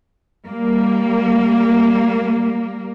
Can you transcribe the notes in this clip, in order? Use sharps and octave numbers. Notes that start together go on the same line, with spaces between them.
G3 A#3